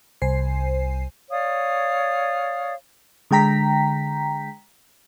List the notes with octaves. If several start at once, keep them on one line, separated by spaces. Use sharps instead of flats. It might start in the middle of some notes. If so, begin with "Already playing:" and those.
C2 C5 G#5 C7
C#5 D5 F5 D#6
D3 G#3 G5 A#5 B6